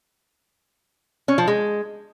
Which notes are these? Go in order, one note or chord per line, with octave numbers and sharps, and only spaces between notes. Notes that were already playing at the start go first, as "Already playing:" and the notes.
C#4
F3
G#3